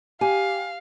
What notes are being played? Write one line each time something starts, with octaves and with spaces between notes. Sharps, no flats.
G4 F5 G#5